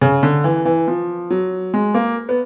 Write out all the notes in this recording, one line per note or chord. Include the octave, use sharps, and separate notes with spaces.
C#3
D3
E3
E3
F3
F#3
G#3
A#3
B3